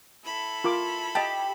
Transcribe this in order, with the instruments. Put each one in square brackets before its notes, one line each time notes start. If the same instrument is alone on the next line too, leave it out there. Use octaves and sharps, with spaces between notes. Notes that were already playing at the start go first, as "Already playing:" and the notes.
[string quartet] E4 A4 B5
[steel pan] F4 A#4 D6
[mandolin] G4 [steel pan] D#5 A5